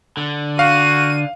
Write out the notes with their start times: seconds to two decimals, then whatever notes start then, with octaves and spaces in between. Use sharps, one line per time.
0.17 D3
0.59 F#4 F5 D#7